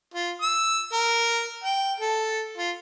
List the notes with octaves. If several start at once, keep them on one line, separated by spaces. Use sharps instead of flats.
F4
E6
A#4
G5
A4
F4